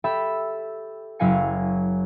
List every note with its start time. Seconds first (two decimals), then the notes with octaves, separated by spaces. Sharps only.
0.04 G4 A4 E5 B5
1.19 F#1 F#3 E4 F5 G#5 C#7